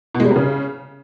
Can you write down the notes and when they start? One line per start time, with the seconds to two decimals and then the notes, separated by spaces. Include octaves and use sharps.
0.14 B2
0.20 G#3
0.25 G3
0.30 C3
0.36 C#3